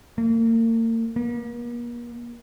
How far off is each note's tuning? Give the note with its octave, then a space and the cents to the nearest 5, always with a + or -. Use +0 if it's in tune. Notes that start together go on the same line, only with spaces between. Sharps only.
A#3 -40
A#3 +40